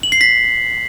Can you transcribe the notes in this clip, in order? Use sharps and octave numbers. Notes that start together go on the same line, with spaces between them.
F#7
C7
B6